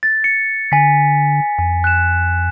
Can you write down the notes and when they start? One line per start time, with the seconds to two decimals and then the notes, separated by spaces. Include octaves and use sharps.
0.03 A6
0.24 C#7
0.72 D3 G#5 B6
1.58 F2 G#5
1.84 F#6 E7